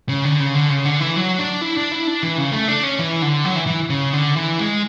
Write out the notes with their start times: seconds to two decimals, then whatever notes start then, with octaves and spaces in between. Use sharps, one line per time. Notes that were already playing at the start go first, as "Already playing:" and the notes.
0.09 C#3
0.25 D3
0.40 C#3
0.55 D3
0.70 C#3
0.85 D3
1.00 E3
1.16 F#3
1.39 D4
1.61 E4
1.77 D4
1.92 E4
2.07 D4
2.23 E3
2.38 C#3
2.53 A3
2.68 D4
2.83 C#4
2.99 E3
3.22 D3
3.45 F#3
3.56 E3
3.67 E3
3.90 C#3
4.13 D3
4.36 E3
4.59 G#3